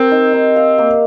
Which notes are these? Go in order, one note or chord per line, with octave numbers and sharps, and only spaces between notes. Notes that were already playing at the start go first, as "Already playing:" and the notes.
Already playing: C4 G4 A#4
D#4
D#4
F5
A#3